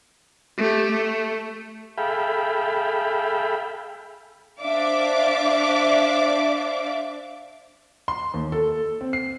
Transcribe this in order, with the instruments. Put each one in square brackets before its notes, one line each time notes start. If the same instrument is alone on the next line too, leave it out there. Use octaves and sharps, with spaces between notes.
[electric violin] A3 G4
A3
[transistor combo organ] G#4 A4 E5 F5 G5 B5
[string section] D4 C5 D5 E5 F5 D6
[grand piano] C6
D#2
A4
C4
C7